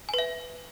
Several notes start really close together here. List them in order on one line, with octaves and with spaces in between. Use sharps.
G#5 B4 E5